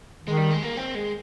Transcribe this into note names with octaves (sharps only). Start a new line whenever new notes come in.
D#3 G#3
G3
G#3
A#3
C4
G#3